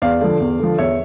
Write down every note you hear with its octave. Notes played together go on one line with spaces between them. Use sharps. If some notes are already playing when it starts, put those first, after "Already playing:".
E2 D5 F5
D3 F3
E2
D3 F3
E2 C#5 E5